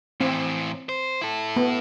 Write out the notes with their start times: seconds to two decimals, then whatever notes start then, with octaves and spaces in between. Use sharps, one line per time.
0.21 A2 E3 C4
0.89 C5
1.21 E4 A4
1.56 B3